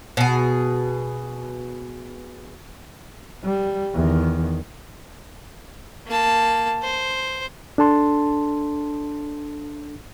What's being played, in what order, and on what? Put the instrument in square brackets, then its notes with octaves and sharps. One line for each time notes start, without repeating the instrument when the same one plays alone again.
[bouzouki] B2 G#4
[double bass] G3
E2 D#3
[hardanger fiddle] A#3 A5
C5
[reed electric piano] D4 A4 A5 C6